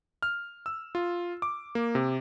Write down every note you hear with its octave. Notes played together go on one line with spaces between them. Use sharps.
F6
E6
F4
D6
A#3
C3